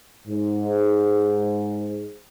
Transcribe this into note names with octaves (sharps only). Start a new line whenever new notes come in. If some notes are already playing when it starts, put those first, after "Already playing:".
G#2